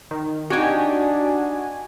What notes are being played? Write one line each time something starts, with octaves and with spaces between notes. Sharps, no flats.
D#3
D4 D#4 F#4 G4 G#5